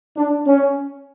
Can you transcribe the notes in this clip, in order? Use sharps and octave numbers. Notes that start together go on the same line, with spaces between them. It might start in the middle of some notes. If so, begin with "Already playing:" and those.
D4
C#4